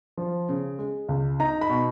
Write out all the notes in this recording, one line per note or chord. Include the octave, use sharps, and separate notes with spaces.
F3
C#3
G#3
C#2
D#4 A#5
B5
B2